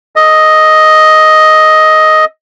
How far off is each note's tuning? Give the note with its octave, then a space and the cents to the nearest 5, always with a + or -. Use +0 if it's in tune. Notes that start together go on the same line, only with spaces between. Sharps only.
A4 +0 D#5 +5